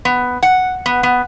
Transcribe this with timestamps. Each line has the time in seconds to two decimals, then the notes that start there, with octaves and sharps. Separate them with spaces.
0.05 B3
0.43 F#5
0.86 B3
1.03 B3